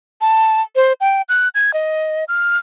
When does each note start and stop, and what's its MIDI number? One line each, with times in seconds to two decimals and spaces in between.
0.21 0.62 81
0.76 0.93 72
1.01 1.22 79
1.29 1.49 90
1.55 1.74 92
1.74 2.24 75
2.28 2.58 89